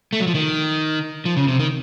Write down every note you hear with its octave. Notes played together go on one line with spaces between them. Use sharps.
A3
F#3
F3
D#3
F3
C#3
C3
D#3